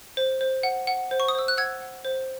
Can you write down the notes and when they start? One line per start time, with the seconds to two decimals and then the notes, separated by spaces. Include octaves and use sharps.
0.17 C5
0.41 C5
0.63 F#5
0.87 F#5
1.11 C5
1.20 C#6
1.28 D#6
1.35 C5 E6
1.48 F#6
1.58 F#5 E6 G#6
1.82 F#5
2.05 C5